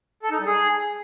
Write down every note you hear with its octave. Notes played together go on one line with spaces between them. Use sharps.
A4
D#4
G3
G#4